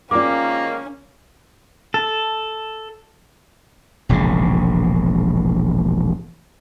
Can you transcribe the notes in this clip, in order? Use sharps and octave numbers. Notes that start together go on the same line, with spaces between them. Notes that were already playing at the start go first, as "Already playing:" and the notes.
G#2 D#3 A#3 C#4 F4 A#4 D5 D6
A4
E1 A#1 G#2 C#3